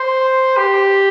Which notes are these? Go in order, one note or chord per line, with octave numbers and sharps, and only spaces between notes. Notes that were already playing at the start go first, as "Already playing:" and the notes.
Already playing: C5
G4